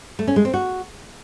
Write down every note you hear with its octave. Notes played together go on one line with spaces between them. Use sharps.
A3
C#4
G#3
C4
F#4